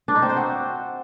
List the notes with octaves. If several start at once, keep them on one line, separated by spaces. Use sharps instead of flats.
D4
D#4
C4
C5
F#4